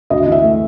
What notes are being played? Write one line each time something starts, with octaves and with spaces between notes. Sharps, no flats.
D2 D#5
E3 E5
A3